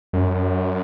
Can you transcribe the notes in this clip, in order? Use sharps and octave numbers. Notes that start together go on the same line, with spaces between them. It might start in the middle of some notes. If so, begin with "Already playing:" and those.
F#2